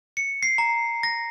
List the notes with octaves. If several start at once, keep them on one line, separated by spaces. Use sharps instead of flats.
C#7
C7
A#5
A#6